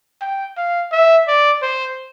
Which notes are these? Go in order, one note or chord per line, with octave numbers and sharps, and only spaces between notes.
G5
F5
E5
D5
C5